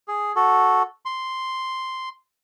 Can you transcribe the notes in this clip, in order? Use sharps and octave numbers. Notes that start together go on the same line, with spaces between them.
G#4
F#4 A4
C6